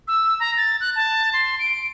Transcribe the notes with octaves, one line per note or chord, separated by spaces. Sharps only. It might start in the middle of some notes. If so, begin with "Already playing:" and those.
E6
A#5
A6
F#6
A5
C6
D7